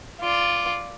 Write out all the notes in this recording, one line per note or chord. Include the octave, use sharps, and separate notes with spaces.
F4 D5